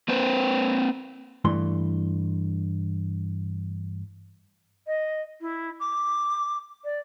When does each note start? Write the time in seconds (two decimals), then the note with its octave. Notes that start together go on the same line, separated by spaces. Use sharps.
0.08 A#3 C4 B4 C5
1.45 G2 E3 A3 C6
4.86 D#5
5.41 E4
5.79 D6
6.84 D5